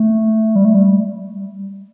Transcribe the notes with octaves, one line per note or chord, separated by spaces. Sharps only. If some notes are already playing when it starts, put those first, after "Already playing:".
Already playing: A3
G3
A3
G3